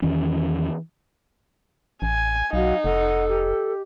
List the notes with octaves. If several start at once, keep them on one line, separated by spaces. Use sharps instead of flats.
E2 D#3 E3 C#4
A1 G#5
B1 F#3 D#4 F5
F1 A4 F#5
G4